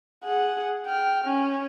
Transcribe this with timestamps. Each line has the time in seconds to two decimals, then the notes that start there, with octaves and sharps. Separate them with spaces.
0.24 G#4 F#5
0.86 G5 F6
1.24 C#4